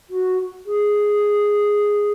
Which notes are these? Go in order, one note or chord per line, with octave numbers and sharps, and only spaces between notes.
F#4
G#4